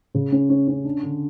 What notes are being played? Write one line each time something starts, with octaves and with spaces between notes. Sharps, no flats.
C#3
C#4
C#4
C#4
D4
D3